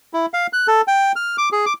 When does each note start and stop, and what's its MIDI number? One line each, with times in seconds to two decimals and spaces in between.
0.13 0.26 64
0.34 0.47 77
0.53 0.67 90
0.68 0.81 69
0.88 1.12 79
1.16 1.36 89
1.38 1.49 86
1.52 1.65 68
1.66 1.73 86